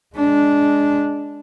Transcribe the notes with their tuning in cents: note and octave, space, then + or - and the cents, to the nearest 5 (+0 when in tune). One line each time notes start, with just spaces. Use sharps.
G#3 +0 D4 -10